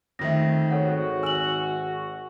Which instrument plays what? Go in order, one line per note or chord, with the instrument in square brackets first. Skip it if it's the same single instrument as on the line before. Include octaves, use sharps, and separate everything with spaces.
[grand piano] F2 D#3 A3 [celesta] A#6
[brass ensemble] G#1 F#4 [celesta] A4 C#5 F#5
[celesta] G#5 F#7 [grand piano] E6